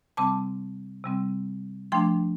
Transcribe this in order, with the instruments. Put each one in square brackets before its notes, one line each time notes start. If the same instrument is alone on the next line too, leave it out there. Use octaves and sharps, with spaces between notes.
[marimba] C3 G3 C4 A5 D6
C3 G3 C4
F3 A3 D4 G5 C6